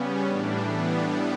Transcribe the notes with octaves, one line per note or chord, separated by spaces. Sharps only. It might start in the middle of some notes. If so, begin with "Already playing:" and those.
Already playing: C#3 G3 B3 C#4
A2 E3 G3 D4
B3